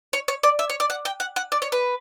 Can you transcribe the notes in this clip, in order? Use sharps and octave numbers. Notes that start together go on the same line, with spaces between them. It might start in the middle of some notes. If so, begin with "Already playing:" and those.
C#5
C#5
D5
E5
C#5
D5
F#5
G5
F#5
F#5
D5
C#5
B4